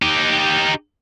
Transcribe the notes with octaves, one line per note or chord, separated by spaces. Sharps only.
D#4 G4